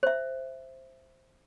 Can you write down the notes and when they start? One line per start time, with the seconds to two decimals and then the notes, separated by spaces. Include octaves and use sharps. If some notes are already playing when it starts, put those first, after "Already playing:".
0.03 C5 E5